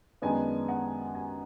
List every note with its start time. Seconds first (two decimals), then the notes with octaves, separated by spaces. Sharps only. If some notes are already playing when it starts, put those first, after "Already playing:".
0.22 F#2 D#3 G#3 B3 D4 G#5
0.68 F#5
1.15 G#5